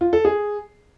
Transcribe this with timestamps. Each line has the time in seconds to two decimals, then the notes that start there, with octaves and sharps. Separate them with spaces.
0.01 F4
0.13 A4
0.25 G#4